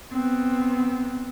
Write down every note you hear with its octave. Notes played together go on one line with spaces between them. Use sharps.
B3 C4